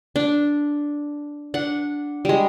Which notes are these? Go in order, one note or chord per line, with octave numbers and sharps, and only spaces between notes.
D4
D4 F#5
G3 G#3